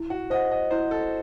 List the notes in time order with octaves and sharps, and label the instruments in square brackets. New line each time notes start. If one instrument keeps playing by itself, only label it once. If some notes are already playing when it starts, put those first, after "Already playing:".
Already playing: [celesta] E4
[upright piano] F#4
[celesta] C5 [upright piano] D#5
[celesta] F#5
[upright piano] D#5
[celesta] E4 [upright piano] C5
[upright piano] A4